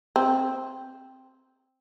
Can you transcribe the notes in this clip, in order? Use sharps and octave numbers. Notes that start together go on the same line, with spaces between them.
C4